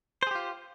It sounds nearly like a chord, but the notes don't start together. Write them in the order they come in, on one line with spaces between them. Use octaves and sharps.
C5 G#4 G4 F4